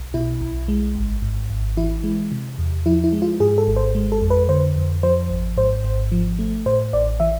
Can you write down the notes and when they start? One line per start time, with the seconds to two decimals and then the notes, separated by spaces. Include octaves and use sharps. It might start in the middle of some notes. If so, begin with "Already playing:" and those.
Already playing: B1
0.14 B2 E4
0.41 B1
0.68 G#3
0.95 G#1
1.22 G#2
1.50 G#1
1.77 E3 E4
2.04 G#3
2.32 C3
2.58 E2
2.86 F3 E4
3.04 E4
3.13 G#3
3.22 F4
3.40 G#2 G#4
3.58 A4
3.68 G#1
3.76 C5
3.95 G#3
4.12 A4
4.22 F2
4.30 B4
4.48 D3 C5
4.76 F2
5.03 F3 C5
5.30 G#1
5.57 G#2 C5
5.84 G#1
6.12 F3
6.39 A3
6.66 A2 C5
6.93 A1 D5
7.20 E3 E5